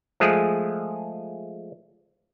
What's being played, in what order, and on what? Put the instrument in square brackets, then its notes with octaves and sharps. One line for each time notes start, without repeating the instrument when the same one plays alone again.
[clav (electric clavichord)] F3 G#3 A3 G#4